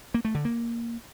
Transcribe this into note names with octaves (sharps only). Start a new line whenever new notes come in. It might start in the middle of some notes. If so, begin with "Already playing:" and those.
A#3
A3
D3
A#3